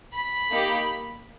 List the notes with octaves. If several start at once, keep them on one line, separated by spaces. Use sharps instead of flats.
B5
A#3 D#4 G4